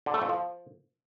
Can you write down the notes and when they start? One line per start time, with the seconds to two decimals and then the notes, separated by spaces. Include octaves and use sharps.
0.06 D3
0.14 A3
0.22 F2
0.29 F3